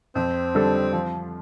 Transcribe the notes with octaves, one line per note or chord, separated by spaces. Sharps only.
F2 C4
D3 G3 D4 A4
F3